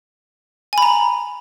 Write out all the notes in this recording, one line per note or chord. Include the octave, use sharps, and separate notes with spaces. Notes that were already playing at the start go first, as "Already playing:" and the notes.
G#5 A#5 B5